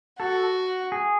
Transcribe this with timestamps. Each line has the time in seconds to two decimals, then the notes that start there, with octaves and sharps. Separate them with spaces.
0.20 F#4 A4
0.92 G#4